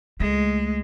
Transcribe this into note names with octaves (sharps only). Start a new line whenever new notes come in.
C#2 G#3 A3